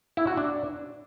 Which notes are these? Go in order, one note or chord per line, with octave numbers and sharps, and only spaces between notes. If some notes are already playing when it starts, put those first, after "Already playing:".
E4
F#4
D4